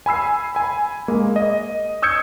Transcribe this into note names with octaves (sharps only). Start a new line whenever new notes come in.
G#5 B5 E6 C7
G#5 B5
G#3 A#3
D#5
D#6 E6 G6 G#6 C#7